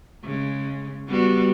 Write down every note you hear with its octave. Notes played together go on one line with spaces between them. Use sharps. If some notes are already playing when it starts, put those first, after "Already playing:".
C#3 G#3
G3 B3 F#4